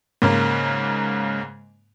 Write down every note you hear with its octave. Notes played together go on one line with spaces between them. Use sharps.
G#2 C#3 A#3